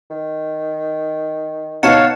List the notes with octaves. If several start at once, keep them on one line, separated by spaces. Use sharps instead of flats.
D#3
B2 B3 D#4 C#5 F5 F#5 A5